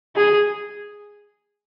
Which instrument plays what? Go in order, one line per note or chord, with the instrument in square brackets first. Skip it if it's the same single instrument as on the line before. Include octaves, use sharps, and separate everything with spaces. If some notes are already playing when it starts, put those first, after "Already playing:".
[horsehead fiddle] G#4